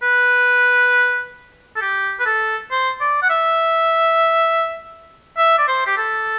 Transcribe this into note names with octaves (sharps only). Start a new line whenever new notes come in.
B4
A4
G4
B4
A4
C5
D5
F#5
E5
E5
D5
C5
G4
A4